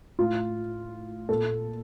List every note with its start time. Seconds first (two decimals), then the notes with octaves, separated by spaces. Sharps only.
0.19 A2 F4
1.29 A#2 A4